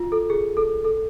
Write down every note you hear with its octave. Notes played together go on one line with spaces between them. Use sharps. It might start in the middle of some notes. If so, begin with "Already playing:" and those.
Already playing: F4 F#4
A4
G#4
A4
A4